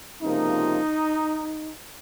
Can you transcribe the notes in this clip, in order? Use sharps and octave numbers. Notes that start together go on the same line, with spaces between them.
C#2 C3 F3 A#3 D#4